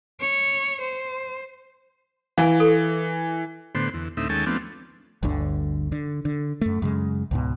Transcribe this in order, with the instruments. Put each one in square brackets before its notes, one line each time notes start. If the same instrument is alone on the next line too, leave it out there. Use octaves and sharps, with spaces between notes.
[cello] C#5
C5
[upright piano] E3 [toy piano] F5 G#5
[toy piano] A4
[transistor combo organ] A2 D3 B3 C5 C6
E2
D2 A2 C4 D#4 E5
D#2 G#3 C#4 A4 G5 A5
F3 A3 B3 C4 D4
[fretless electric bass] G1 D2 D3
D3
D3
F#2 A3
F#2 C#3 G#3
C#2 G#2 B2